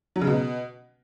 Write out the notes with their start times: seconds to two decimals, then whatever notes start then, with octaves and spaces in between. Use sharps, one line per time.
0.16 F#3
0.21 C#3
0.27 B2